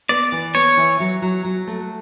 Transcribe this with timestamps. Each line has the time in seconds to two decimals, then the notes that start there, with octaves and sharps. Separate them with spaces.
0.09 B3 D5
0.32 E3
0.54 B3 C#5
0.77 E3
1.00 F#3
1.22 F#3
1.45 F#3
1.67 A3